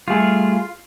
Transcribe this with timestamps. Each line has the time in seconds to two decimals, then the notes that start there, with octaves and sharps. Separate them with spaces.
0.08 G3 A3 F4 G#4